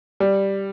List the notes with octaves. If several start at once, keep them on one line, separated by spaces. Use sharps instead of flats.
G3